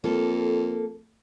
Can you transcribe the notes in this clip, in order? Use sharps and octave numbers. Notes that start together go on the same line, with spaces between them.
F2 A#3 A4